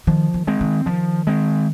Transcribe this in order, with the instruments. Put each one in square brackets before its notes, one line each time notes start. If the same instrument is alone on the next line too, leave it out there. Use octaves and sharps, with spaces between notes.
[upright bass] D#3 [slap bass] F3
[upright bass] D#3
[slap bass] G#3 C4
[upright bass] D#3
[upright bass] D#3 [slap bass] F3
[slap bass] G#3 C4